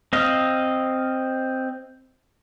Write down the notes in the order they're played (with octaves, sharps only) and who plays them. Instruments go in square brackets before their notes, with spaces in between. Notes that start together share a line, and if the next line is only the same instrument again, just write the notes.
[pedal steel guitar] C4 D#5 F5